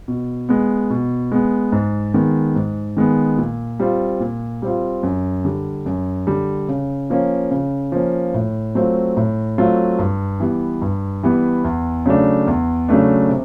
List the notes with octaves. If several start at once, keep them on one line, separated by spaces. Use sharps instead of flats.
B2
G#3 B3
B2
G#3 B3
G#2
D#3 G#3 B3
G#2
D#3 G#3 B3
A#2
G3 C4 F4
A#2
G3 C4 F4
F#2
D3 G3
F#2
D3 G3
C#3
F3 A#3 C#4
C#3
F3 A#3 C#4
A2
F#3 A3 C4 F4
A2
F#3 A3 C4 F4
G2
E3 G3 B3
G2
E3 G3 B3
E2
C#3 F#3 A3 D4
E2
C#3 F#3 A3 D4
C3